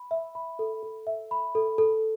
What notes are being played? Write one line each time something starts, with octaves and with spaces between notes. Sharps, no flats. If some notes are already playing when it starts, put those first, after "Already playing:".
Already playing: B5
E5
B5
A4
A4
E5
B5
A4
A4